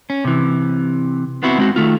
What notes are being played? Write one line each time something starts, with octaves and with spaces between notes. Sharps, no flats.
C#4
C3 E3
B3 C4 E4 F#4
G#3 C4 F#4
D#3 A3 F4